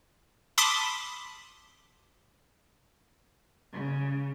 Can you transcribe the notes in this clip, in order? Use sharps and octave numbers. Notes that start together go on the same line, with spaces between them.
A5 B5 C6 D6 D#6 B6
C#3